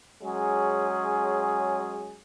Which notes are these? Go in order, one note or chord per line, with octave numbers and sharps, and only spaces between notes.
F#3 G#3 C#4 G#4